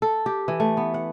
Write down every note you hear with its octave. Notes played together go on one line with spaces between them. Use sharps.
A4
G4
E3
A3
B3
F#5